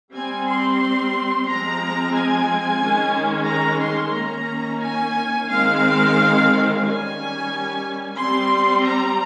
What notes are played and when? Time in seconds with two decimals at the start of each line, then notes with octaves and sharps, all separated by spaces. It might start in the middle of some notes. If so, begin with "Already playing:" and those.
0.13 G3 C4 G#5
0.46 C6
1.47 F3 G#3 C4 A#5
2.14 G#5
2.81 D#3 G#3 C#4
3.47 A#5
3.81 C6
4.14 D#3 A#3 C#4 A#5
4.81 G#5
5.48 D#3 G#3 C4 F5
6.82 D#3 G3 C#4 G#5
8.16 G3 C4 C6
8.83 A#5